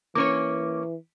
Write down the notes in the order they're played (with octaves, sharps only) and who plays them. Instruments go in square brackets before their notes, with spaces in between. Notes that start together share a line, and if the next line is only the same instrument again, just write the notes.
[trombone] E3 [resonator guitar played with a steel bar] A#3 C#4 C#5 [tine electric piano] C#6 D6